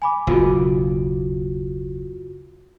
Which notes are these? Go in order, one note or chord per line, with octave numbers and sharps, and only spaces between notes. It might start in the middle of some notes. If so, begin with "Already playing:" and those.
G#5 B5 D6
F#1 D#2 B2 F4 F#4